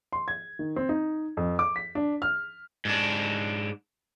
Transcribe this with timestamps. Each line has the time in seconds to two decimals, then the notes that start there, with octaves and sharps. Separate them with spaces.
0.13 C6
0.28 G#6
0.59 D#3
0.76 C4
0.89 D#4
1.37 F2
1.59 D6
1.76 B6
1.95 D4
2.22 F6
2.85 G#2 D4